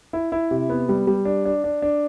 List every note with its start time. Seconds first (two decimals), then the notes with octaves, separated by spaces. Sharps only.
0.13 E4
0.32 E4
0.51 C3
0.69 B3
0.89 G3
1.07 G3
1.25 D4
1.45 D4
1.64 D4
1.82 D4